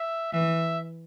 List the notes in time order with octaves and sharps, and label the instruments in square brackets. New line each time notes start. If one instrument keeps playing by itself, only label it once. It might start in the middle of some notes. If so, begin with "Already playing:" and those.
Already playing: [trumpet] E5
[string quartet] E3 [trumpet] E5